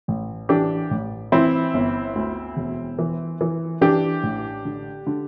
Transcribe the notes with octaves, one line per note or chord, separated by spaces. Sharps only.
A1
E3 D4 G4
A1
E3 C4 E4
G1
D2
E1
E3
E3
E3 D4 G4
A1
D3
D3